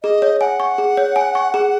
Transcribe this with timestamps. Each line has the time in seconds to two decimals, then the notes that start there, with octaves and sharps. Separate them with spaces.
0.03 G#4 D#5
0.22 C#5
0.40 F#5 G#5
0.60 C#6
0.78 G#4
0.97 C#5
1.16 G#5
1.35 C#6
1.54 G#4